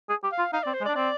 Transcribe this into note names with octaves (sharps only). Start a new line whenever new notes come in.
G#4
G4
F5
F4
D#4 F5
C4 D5
C5
G#3
D5
D4
C4 D5